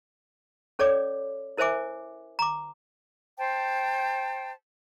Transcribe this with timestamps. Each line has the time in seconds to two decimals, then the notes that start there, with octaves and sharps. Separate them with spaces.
0.79 C#4 A4 C#5 D5 D6
1.58 E4 A#4 C5 E5 G#5 D6
2.39 A#5 D6
3.38 C5 G5 A5